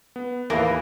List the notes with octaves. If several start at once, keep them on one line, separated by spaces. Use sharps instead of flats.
B3
D#2 A2 E3 A#3